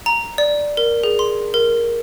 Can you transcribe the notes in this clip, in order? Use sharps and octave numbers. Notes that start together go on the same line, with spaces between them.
A#5
D5
A#4
G#4
C6
A#4